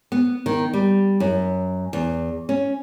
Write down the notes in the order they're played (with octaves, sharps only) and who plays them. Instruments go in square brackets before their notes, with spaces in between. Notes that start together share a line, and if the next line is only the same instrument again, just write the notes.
[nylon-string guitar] B3
D#3
G3
F#2
E2
C#4